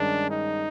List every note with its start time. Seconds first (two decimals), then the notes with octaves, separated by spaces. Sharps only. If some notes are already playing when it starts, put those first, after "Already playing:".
Already playing: G2 D#3 G#3 C#4 D4
0.30 D#4